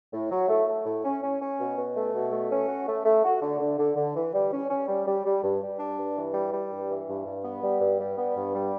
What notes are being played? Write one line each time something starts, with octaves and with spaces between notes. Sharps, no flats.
A2
F#3
A3
A3
A2
C#4
C#4
C#4
B2
B2
A3
B2
A3
C#4
F#4
A3
A3
F#4
D3
D3
D3
D3
E3
G3
C#4
C#4
G3
G3
G3
G2
G3
D4
G2
E3
G3
G3
G2
E3
G2
G2
B3
G3
G2
G3
B3
G2
G3